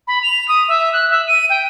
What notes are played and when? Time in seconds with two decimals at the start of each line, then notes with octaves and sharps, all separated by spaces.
0.07 B5
0.22 F7
0.48 D#6
0.68 E5
0.93 F#6
1.10 E5
1.27 D#7
1.50 G5